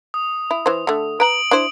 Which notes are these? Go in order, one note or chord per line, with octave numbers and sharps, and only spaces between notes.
D#6
E4
E3 C5
D3 A3
B4 A#5 D7 F#7
D4 E4 C5